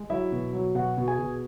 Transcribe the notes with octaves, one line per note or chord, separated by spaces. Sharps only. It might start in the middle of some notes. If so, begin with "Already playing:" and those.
Already playing: G#3
F#3 E4 E5
B2
F#3
B2 F#4 F#5
B2
G#4 G#5
B2